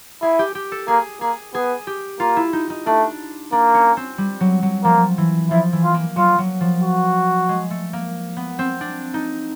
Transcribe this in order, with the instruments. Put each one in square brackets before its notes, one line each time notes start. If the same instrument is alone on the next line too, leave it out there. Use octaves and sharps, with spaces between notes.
[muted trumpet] E4 [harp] G#4
[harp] G4
G4
A4
[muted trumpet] A#3 [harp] G#4
[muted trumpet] A#3 [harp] G#4
[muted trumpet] B3 [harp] G#4
[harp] G4
[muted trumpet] A#3 [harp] F4
[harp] E4
D#4
D#4
[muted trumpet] A3 [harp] D4
[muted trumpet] A#3 [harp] D4
[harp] C#4
C4
G3
F#3
F#3
[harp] F3 [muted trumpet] A#3
[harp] E3
[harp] F3 [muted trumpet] E4
[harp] E3
[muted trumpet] F4
[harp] A#3
[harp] F#3 [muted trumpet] F4
[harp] F#3
F3
[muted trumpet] F#4
[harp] G#3
A3
A#3
B3
C4
D4
D#4